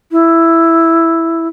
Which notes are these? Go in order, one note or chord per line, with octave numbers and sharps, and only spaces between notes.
E4